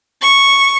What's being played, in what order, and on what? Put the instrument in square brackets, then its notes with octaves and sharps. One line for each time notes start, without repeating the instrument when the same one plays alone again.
[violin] C#6